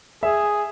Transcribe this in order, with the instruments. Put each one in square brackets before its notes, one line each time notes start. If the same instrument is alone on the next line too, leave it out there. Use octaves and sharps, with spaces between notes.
[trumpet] G#4 [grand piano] E5